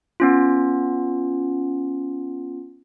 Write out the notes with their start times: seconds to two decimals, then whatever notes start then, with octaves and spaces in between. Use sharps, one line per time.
0.20 B3 C#4 F4